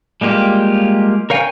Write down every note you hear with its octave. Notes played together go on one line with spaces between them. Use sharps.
G3 G#3 A#3 F4 G4
A#4 C#5 F5 G5 G#5